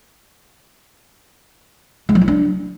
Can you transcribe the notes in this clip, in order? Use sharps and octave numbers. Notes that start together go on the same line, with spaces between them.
G#3
F#3
E4
D4